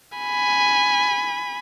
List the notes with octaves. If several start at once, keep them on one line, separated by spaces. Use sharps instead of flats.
G#5 B5